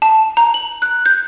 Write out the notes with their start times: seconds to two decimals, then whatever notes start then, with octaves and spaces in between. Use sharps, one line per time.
0.02 A5
0.37 A#5
0.54 F#7
0.82 F#6
1.06 G6